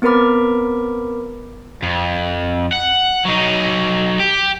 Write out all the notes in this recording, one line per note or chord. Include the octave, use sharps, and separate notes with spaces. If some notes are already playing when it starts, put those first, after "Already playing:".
B3 C4 A#4 B4 B5 D6
F2
F#5
F#3 D#4
G4